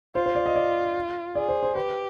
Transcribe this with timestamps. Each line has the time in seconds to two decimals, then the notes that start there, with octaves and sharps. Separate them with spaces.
0.15 F4 C5
0.26 C5
0.35 D5
0.46 D#5
0.56 D5
1.35 G#4 D5
1.49 C5
1.63 C5
1.75 G4 B4